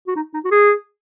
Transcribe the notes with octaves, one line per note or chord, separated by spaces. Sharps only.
F#4
D#4
D#4
F#4
G#4